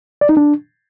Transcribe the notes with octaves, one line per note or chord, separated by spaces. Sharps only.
D5
D#4
D4